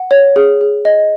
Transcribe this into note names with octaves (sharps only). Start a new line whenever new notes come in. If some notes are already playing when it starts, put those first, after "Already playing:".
Already playing: F#5
C#5
G#4
G#4
D#5